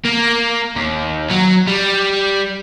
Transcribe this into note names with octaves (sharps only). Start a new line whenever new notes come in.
A#3
D#2
F#3
G3